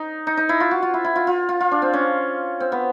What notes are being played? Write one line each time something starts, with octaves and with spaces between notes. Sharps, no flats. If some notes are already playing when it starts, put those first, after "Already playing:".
Already playing: D#4
D#4
D#4
E4
F4
F#4
F4
E4
E4
F4
F4
F4
F4
D4
C4
C#4
C4
B3